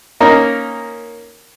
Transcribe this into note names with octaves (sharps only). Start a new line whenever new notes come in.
A#3 C#4 D#4 A#4